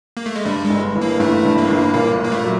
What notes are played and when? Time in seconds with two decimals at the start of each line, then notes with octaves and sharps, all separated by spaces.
0.17 A#3
0.26 A3
0.36 G#3
0.45 G2 G3
0.64 G#3
0.70 G1
0.95 E3
1.01 A#3
1.20 G1 A3
1.45 G2
1.58 A#3
1.70 G1
1.94 A#2 A#3
2.20 A#2 A#3
2.32 A3
2.44 F#3